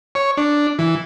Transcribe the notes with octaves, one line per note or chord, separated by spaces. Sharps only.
C#5
D4
E3